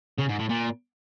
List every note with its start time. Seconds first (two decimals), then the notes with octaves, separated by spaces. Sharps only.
0.19 C#3
0.29 G#2
0.40 A2
0.50 A#2